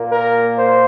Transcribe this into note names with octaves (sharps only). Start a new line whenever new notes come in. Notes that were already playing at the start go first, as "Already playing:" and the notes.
Already playing: A#2 A#3
A#4
C5